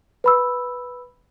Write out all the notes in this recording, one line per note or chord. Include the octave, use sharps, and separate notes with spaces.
B4 B5 E6